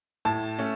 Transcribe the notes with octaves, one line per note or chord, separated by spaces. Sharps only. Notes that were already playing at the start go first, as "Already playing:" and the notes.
A2 A5
A3 C#4